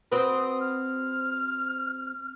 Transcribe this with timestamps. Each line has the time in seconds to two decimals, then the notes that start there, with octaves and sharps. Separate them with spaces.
0.12 C4 F#4 B4 D#6
0.60 F6